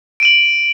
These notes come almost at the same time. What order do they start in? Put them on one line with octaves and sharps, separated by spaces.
D7 D#7 F#7